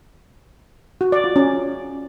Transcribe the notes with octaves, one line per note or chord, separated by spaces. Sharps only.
F#4
D5
F4
C#4